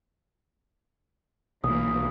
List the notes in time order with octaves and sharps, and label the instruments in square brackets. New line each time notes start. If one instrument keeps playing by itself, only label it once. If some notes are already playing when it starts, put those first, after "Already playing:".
[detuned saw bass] B1 [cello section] E3 A#3 [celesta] D#6